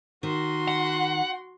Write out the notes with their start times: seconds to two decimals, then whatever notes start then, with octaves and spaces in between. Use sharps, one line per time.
0.23 D#3 F#4 C6
0.68 F#5